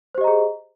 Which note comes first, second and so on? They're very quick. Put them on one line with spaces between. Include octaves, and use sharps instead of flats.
C5 G4 D#5 A#5 G#4